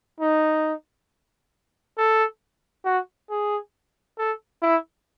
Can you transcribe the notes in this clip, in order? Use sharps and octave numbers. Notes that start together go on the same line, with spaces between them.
D#4
A4
F#4
G#4
A4
E4